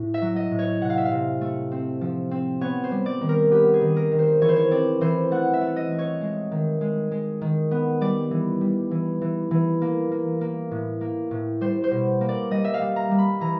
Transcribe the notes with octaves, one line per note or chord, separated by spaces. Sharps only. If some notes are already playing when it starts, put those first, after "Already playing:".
Already playing: A2
E5
F#3
D#5
A2
C#5
C3 F#5
F5
E5
F5
C3
A3
C4
F3
C4
B3 C#5
C5
G3
D5
D#3
A#4
B3 G4
G#4
D#3
A#4
D#3
C5
E3 C#5
C5
C#5
C4 D5
E3 C5
A3 F#5
E5
A3
D#5
A3
C#5
G#3
D#3
G#3
G#3
D#3
B3
G3 D5
E3
G3
E3
E3
E3
A#3
A#3
A#3
A2
A#3
A2
G3 C5
C5
B2
A#3
D5
G3 D#5
E5
F5
G3
A#5
G3
B5
E3 A#5